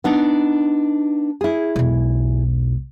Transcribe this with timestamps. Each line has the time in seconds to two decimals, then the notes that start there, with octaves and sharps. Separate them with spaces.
0.04 B3 D4 D#4
1.41 E4 G#4
1.76 E1 B1